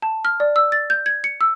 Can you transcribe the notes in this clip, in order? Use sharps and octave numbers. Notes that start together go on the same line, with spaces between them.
A5
F6
D5
E6
A6
G6
G#6
C#7
E6